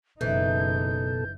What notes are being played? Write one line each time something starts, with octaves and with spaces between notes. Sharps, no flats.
F#1 B2 E3 D#4 A4 G6